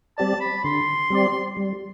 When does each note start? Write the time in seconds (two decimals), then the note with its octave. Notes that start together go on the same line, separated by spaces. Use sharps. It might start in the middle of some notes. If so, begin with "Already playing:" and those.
0.18 G3 C4 G4 D5 A5
0.40 B5
0.64 D3 C6
1.10 G3 C4 G4 D5
1.57 G3